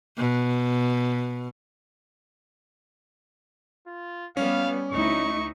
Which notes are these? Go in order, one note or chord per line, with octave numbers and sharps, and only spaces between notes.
B2
F4
G3 B3 C#4 F5
D2 D#4 E4 C#6